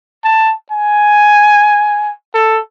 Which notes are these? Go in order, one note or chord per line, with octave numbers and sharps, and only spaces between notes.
A5
G#5
A4